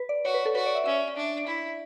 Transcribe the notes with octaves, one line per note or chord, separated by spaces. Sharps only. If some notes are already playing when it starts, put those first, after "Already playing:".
Already playing: B4
D5
F#4 C#5
B4
A4
F#4 B4
D5
E5
C#4 E5
D4
E4